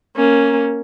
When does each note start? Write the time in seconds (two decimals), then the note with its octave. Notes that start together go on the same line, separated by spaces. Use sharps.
0.16 A#3 C#4